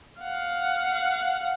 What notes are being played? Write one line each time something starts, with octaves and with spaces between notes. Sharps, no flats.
F5 F#5